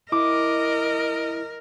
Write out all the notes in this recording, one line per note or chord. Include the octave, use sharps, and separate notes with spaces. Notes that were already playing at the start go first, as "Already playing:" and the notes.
E4 A#4 D#5 D6